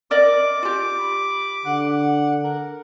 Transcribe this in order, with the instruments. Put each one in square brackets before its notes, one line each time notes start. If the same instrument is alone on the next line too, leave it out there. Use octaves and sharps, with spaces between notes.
[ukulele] A#4 D5 D#5 [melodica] D6
[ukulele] F4 G4
[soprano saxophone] B5
[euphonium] D3 [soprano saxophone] F#5
[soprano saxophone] A#4